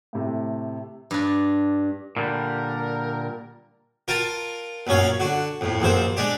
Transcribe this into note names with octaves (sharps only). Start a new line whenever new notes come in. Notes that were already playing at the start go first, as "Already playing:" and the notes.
A2 C3 A3
G2 D4
A#2 D3 G3 A#4
F4 A#4 G5 A5
A#1 F#2 C#4 C#5 F5
D3 F#4
F2 A2
A#1 F#2 A#3 C5
G#3 D4 G4